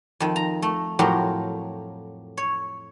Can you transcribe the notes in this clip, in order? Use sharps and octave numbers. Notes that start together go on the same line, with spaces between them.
F2 D#3
A#5
A3
F2 A2 F#3 G4 A#4
C#5